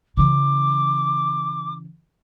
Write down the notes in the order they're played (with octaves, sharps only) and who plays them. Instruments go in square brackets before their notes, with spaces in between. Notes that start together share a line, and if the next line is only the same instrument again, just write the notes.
[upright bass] C#3 E3 [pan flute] D6